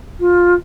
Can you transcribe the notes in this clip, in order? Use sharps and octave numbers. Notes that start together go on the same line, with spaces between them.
F4